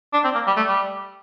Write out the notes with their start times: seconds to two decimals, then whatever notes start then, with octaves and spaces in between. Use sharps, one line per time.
0.13 D4
0.24 C4
0.35 A#3
0.47 G3
0.57 A3
0.68 G3